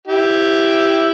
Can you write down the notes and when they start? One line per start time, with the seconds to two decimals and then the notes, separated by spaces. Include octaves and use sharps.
0.08 E4 G4